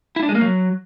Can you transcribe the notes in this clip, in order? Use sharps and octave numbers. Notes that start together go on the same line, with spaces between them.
E4
D4
G#3
A#3
F#3